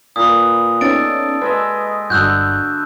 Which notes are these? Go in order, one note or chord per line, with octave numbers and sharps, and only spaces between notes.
A#2 B4 D#6
B3 C#4 D#4 A4 D5 A6 D7
G#3 B4 D#5 E5
G1 G2 D3 F#4 E6 F#6 G6